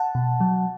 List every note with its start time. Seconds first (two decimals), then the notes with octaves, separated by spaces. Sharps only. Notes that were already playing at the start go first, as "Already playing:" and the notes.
Already playing: F#5 A5
0.15 B2
0.40 F#3